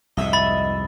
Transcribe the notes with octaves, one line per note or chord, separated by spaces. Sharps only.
C2 F2 G#2 D#5 E5
B5 A6